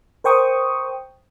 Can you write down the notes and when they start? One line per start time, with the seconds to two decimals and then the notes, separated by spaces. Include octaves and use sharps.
0.24 A#4 C5 G5 C#6 D#6